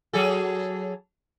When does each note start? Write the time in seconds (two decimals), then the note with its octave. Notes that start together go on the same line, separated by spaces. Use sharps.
0.13 F#3 G#4 A4